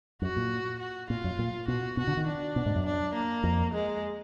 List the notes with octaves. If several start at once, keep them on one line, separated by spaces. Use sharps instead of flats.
F#2 F#4
A#2
F#4
A#2 F4
F#2
A#2
B2 F#4
B2 F#4
D3
D#3
D4
B2
G#2
F#2
D4
A#3
F2
G#3